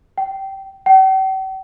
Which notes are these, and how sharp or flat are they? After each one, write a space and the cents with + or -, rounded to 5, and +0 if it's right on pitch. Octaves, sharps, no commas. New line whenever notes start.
G5 -15
G5 -45